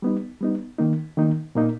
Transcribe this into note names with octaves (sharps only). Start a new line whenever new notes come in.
G3 B3 D#4
G3 B3 D#4
D#3 A#3 D#4
D#3 A#3 D#4
A#2 A#3 D#4